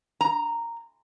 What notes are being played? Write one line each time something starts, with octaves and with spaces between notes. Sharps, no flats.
A#5